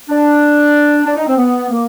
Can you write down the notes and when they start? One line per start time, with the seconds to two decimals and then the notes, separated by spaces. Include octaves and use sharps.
0.09 D4
1.05 D4
1.16 D#4
1.27 C4
1.37 B3
1.70 A#3